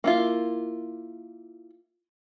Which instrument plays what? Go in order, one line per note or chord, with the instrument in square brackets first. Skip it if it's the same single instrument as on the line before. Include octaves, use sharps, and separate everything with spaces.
[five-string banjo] A#3 E4 F4